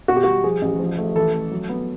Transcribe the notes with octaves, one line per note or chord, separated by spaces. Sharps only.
B2 F#4
G4
G3 F#4
F3 G#4
A1
F3
A3
E3 A4
A3
F#3
B3